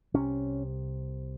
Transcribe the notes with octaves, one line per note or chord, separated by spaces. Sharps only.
C2 C3 C#4